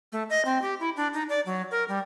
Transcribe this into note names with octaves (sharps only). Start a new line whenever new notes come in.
A3
D#5
C4
G4
E4
D4
D#4
D5
F#3
A#4
G3